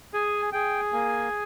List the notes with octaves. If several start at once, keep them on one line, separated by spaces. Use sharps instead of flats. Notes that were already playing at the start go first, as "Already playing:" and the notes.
G#4 G#5
G#4 G5
A#3 G#5